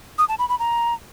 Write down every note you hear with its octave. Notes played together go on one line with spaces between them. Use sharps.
D#6
A5
B5
B5
A#5